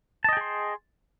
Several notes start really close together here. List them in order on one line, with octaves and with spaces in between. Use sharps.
A5 D#5 G5 G#4 C6